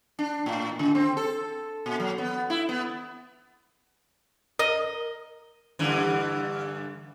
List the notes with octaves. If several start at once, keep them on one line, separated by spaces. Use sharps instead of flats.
D4
A2
C#3
C4
A4
A#2
F#3
B3
E4
B3
A#4 D#5
G2 D3 E3